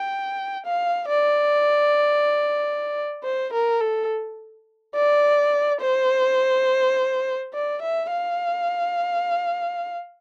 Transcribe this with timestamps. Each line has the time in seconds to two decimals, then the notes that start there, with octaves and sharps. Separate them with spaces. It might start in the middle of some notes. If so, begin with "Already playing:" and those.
Already playing: G5
0.66 F5
1.08 D5
3.24 C5
3.53 A#4
3.81 A4
4.95 D5
5.81 C5
7.54 D5
7.82 E5
8.11 F5